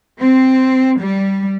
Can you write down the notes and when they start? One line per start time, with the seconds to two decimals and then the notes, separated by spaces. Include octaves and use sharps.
0.20 C4
1.00 G3